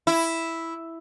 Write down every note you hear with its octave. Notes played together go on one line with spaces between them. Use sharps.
E4